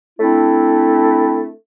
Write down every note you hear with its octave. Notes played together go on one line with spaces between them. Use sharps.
A3 C4 D4 E4